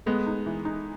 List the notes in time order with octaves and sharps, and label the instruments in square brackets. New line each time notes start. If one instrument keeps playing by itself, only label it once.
[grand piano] G#3 B3 [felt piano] A3
[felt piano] D#4
E3
D#4